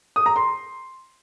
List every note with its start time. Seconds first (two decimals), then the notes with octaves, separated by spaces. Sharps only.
0.16 D#6
0.26 A#5
0.36 C6